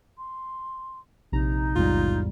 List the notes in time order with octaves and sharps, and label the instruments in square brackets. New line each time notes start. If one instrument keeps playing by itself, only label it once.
[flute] C6
[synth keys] A#1 C3 A#5 [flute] D#4
[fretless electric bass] E2 G#2 G3 [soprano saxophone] F4